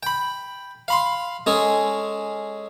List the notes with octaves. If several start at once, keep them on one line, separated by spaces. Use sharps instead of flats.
G5 B5
F5 B5 C6
G#3 C#4 G#4 A4